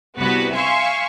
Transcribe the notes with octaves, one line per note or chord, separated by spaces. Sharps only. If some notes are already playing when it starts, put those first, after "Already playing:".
C2 B3 F#4 B4
E5 F5 G#5 C6 C#6